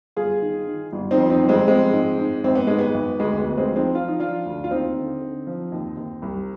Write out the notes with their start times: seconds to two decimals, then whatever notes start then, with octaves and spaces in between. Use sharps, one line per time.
0.16 G1 F4 G#4
0.42 D#3
0.68 D#3
0.92 G1
1.11 C4 D#4
1.17 F2
1.30 C4 D#4
1.43 G1
1.49 G#3 C4
1.67 F3 G#3 C4
1.93 G#2
2.19 G#2
2.44 G#1 C4
2.55 B3
2.67 G#2 G#3
2.79 B3
2.94 G#1
3.19 D2 G#3
3.39 B3
3.45 D2
3.57 G#3 C4
3.70 F3
3.76 C4 D#4
3.95 F3 F4
4.08 D#4
4.20 F3 D4 F4
4.46 D2
4.64 F4
4.71 D#2 C4 D#4
4.96 D3
5.22 D3
5.47 F3
5.72 D#2
5.97 D#2
6.22 C2